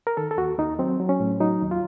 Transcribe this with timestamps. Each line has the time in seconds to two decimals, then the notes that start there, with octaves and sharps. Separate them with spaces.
0.07 A#4
0.17 D#3 A4
0.31 A4
0.38 D#2 F#4
0.58 D#2 D#4
0.79 F#3 C4
1.00 F#3
1.09 C#4
1.20 A2
1.40 F#3 D#4
1.62 D#2
1.71 F4